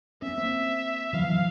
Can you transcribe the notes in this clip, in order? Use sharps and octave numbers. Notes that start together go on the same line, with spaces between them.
B3 C#4 E5
A#3 C4
E3 F#3 F5
F3
E3 F#3